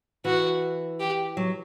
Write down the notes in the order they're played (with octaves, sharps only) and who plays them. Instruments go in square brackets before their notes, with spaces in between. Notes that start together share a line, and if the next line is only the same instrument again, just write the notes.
[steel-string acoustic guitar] E3 [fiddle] F#4
[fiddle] G4
[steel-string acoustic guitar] F#3